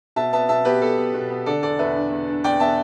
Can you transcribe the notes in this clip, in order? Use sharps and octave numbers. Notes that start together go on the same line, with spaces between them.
B2 E5 A5
B3 E5 A5
B2 E5 A5
B3 G4 B4
B3 A4
B3
B2
B3
D3 A4 D5
E2 A4 D5
E2 B4 E5
D4
E2
D4
E2 D5 G5
B3 E5 A5